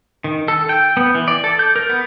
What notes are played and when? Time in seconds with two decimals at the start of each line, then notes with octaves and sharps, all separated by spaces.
0.24 D#3
0.48 A4
0.69 G5
0.97 B3
1.15 E3
1.28 D5
1.44 A4
1.59 G6
1.76 A#4
1.89 B3